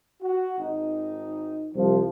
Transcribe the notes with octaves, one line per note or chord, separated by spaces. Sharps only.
F#4
G#1 D#4
C2 F3